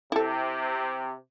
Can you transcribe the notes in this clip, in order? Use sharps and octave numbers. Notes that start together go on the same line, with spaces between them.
C3 E4 A4